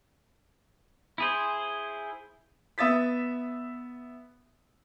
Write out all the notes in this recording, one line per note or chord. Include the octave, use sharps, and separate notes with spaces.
E4 G#4 C5
B3 E5 D#6 A6 B6